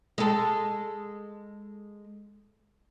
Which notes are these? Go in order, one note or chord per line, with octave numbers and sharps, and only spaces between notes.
G#3 A4